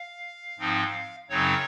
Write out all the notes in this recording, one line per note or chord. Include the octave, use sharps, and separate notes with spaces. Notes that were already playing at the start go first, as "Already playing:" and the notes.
Already playing: F5
G#2 F3 C4 D#4
F#2 C#3 F#3 C4 D#4 C#5